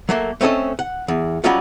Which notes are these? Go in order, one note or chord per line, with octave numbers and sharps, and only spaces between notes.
F#3 A3 A#3
A3 C4 C#4 A4 D#5
F#5
E2
F#3 G3 C#4 D#4 F4 F#4